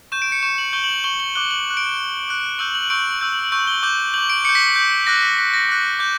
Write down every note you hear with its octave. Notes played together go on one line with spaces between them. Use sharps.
C#6 G6 E7
D7
C#7
C#6 G6 E7
F#7
C#6 G6 G7
F#7
E7
C#6 G6 G7
G7
D6 F#6 G7
F#7
D6 F#6 E7
D7
E7
D6 F#6
D6 F#6
C#6 E6 G6 F#7
F#7
C#6 E6 G6 D7
C#6 E6 G6
C#6 E6 G6 F#7
G7
D6 G6
D6 G6 F#7
D7
D6 G6 C#7
B6
D6 G6
D6 F#6 A#6
B6
D6 F#6 B6
A#6
D6 F#6
D6 G6